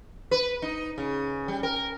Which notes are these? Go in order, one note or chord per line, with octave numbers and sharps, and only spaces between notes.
B4
D#4
C#3
G3
A#4